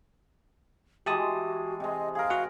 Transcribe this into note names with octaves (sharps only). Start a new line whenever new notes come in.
E3 G#3 F#4 G4 A5 D#6
C3 G#3 D#5
G#4 A#4 F5
F#4 F#5